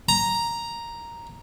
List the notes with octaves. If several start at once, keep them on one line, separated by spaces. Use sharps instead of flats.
A#5